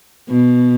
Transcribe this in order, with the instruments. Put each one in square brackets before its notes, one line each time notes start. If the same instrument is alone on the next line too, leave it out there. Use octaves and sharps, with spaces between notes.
[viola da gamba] B2